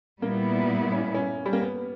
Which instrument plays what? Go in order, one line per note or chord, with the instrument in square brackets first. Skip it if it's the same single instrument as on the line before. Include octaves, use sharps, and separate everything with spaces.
[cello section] A#2 G3 B3 E4 [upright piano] A#3
[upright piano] C#4
C#4
G3
A#3
B3